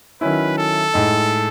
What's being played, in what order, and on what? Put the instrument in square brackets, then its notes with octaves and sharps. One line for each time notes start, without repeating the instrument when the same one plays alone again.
[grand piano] D#3 F#3 C#4 E4 [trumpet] B4
[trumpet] A4
[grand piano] A2 G#3 D#4